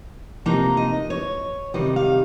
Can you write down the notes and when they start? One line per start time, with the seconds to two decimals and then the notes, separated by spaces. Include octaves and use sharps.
0.46 C3 F3 A#3 D#4 A#5
0.77 D#5
1.10 C#5
1.74 C3 D#3 G3 D#5
1.96 F5